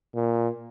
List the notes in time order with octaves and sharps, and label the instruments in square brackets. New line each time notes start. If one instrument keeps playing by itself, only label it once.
[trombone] A#2